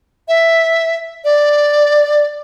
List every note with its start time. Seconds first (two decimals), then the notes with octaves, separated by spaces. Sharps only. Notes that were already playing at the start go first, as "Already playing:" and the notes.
0.28 E5
1.25 D5